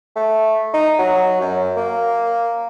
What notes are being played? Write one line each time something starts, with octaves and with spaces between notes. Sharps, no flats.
A3
D#4
F#3
F#2
A#3